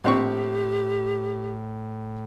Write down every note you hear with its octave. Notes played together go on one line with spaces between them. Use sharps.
A#1 A2 C4 G4 C#6